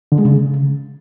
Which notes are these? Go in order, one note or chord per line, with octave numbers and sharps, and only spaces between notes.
D3
G#3
C#3